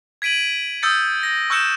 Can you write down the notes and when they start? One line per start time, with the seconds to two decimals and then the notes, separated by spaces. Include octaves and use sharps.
0.22 G#6 B6 D7 D#7 F#7
0.82 D#6 E6 G6 A6 C#7
1.23 A#6
1.50 C#6 E6 F#6 G6 C#7 E7